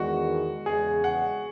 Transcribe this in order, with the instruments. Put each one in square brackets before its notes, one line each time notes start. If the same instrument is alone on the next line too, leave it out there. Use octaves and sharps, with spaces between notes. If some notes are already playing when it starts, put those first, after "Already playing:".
Already playing: [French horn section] E2 D#3 G#3 [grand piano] F#4
[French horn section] E2 C#3 G#3 [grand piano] G#4
[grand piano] F#5